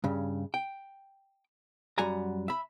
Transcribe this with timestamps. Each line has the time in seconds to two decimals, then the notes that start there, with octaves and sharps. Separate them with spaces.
0.04 G2 C#3
0.54 G5
1.98 F#2 G3 F#4 G#5 A#5
2.48 E5 B5